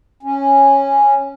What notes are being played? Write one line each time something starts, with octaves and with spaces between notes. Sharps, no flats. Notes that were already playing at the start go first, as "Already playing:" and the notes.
C#4